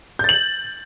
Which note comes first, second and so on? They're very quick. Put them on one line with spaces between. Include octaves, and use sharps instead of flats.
G6 A6 F#7